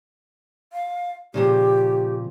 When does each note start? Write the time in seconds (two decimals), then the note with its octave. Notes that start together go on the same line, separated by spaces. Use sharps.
0.73 F5
1.34 A#2 C#3 F3 G4